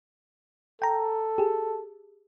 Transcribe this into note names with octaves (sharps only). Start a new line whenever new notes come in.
A4 G5 A#5
G4 G#4